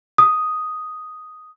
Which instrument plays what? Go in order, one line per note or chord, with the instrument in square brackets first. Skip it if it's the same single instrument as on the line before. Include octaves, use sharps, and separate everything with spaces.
[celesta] D#6